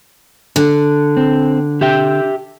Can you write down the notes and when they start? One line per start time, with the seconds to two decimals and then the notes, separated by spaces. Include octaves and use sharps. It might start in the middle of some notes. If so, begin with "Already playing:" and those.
0.56 D3
1.17 C4
1.81 G4 E5 G5